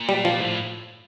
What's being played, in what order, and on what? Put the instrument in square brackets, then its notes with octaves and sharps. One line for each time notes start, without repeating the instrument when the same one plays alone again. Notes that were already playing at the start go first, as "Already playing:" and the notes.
Already playing: [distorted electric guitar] A#2
[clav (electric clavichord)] G3
F3
[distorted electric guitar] A2